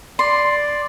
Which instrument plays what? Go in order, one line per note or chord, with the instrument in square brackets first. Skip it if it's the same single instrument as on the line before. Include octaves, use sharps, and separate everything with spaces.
[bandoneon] D5 [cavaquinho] C6